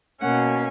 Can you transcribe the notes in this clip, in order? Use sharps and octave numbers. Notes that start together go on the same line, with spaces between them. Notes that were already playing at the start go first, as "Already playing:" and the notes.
B2 A#3 C#4 F#5